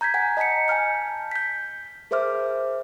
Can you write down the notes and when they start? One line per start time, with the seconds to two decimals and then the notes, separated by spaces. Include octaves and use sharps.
0.01 A#5 G6 G#6 B6
0.14 F#5 G#5 A#5
0.37 D#5 A5 A#5 B6 C#7
0.68 G#5 A5 F6 G6
1.31 G6 B6
2.11 G#4 A#4 C5 E5 D6 F6